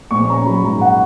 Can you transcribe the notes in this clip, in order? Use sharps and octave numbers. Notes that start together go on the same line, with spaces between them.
A#1 C#6
C#4 A#5
F#3 B5
G#2 A#5
F#5